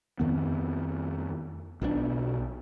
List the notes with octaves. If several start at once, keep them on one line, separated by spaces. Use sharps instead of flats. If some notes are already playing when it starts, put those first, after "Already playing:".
F2 D#3 B3
B1 B2 D3 D4